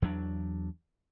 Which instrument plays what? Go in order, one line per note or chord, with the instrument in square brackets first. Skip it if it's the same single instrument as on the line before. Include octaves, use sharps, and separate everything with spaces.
[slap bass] E2 F#3 A3 D4